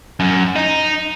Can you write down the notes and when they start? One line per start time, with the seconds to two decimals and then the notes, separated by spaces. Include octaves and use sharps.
0.20 F#2
0.56 D#4